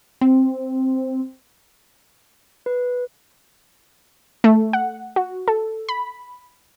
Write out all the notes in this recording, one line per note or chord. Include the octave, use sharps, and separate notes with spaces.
C4
B4
A3
F#5
F#4
A4
B5